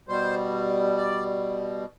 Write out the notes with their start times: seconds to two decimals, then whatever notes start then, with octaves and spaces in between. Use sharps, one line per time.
0.08 B2 G3 C5
0.97 D5